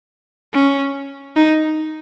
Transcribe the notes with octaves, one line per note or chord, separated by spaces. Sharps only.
C#4
D#4